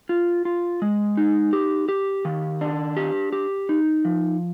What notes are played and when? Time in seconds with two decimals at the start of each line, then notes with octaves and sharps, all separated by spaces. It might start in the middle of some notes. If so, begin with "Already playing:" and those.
0.09 F4
0.45 F4
0.82 G#3
1.17 D#4
1.53 G4
1.89 G4
2.25 D#3
2.61 D4
2.97 G4
3.32 G4
3.69 D#4
4.05 F3